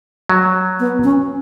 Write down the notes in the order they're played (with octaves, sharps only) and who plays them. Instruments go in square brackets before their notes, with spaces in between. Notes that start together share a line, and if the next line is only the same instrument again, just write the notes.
[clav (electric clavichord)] F#3
[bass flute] B3
C#4